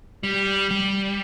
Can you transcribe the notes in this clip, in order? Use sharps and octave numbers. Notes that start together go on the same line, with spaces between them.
G3
G3